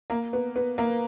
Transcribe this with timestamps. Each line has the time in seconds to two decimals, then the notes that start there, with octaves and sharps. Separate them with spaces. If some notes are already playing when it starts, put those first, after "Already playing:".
0.10 A#3
0.33 B3
0.56 B3
0.78 A#3